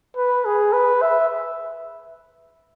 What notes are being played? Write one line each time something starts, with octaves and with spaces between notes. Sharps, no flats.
B4
G#4
B4
E5